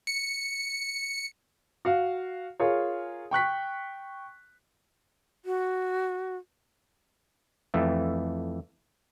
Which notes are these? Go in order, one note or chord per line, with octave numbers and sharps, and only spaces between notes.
C#7
F#4 F5
F4 G#4 A#4 C#5
G5 C#6 F#6 B6
F#4
F2 E3 A3